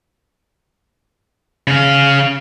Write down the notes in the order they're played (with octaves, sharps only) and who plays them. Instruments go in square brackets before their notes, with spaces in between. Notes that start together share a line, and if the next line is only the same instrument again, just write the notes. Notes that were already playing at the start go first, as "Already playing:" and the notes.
[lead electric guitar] C#3 F5